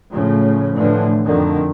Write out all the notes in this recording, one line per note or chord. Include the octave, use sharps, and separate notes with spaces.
A2 C#3 F3
A2 D3 E3 F3
F2 D3 D#3